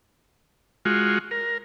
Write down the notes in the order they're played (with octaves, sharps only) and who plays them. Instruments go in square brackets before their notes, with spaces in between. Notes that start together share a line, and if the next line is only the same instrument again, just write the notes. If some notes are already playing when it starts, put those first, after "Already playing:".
[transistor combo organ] G#3 F4 F#4
A#4